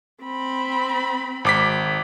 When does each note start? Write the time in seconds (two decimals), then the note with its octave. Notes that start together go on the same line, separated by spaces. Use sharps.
0.24 C4 B5
1.45 G#1 D6 B6